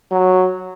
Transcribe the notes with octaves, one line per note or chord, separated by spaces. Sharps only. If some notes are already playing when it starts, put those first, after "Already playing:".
F#3